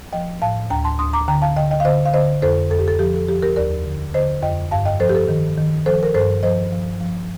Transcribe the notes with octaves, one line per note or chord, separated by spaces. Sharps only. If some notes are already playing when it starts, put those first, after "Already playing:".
F3 D#5 G5
A2 F5 A5
D2 G5 A#5
A5 C6
D2 C6 D#6
A#5 D6
D3 G5 A#5
F5 A5
D3 D#5 G5
D#5 G5
F5
D3 C5 D#5
F5
D3 C5 D#5
F2 A4 C5
F2 A4
G4
A4
F3 G4
A4
F3 G4
G4 A#4
D#2 A#4 D5
D3
D3 C5 D#5
F2 D#5 G5
G2 F5 A5
D#5 G5
F3 A4 C5
G4
A4
D#3
D#3
F3 A4 C5
A#4
G2 A4 C5
F3 C5 D#5
F3
F3